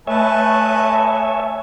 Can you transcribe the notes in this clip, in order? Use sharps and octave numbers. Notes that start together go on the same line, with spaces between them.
A3 B4 C#5 D#5 E5 G#5 A5